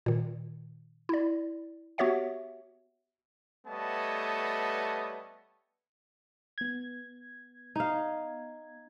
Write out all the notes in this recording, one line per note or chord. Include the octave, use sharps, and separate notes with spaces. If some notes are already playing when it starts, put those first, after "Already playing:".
A#2 D#3
E4 D5
B3 F#4 G4 C#5 E5 F#5
G3 A3 B3 C#5 D#5 A5
B3 G#6
D#4 F5